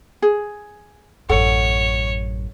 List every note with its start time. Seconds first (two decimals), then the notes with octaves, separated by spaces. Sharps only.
0.22 G#4
1.29 A1 F#2 A4 C#5 F#5